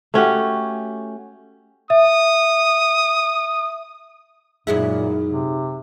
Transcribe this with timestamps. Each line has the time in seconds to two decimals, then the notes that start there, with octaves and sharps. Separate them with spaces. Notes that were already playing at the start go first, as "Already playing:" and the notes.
0.14 A3 C#4 F#4 G4
1.90 E5 D#6
4.67 F#2 A#2 G#3 D#4 E4 G#4
5.27 C3